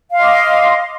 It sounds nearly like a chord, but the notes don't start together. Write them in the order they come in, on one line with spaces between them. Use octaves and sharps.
F5 C6 D#5 D6